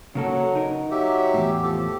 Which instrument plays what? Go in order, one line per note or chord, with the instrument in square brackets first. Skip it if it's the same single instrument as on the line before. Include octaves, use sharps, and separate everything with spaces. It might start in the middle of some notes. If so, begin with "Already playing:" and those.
[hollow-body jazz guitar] C#3 A#3 A4 [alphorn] F#3
[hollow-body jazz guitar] D#4 A#4
[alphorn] F#3 [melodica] G4 E5
[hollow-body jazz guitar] E2 A2
[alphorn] F3 [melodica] G4 A4